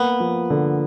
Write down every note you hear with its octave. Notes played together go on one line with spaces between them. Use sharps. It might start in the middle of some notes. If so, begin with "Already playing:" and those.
Already playing: A#3 B3
F3
D3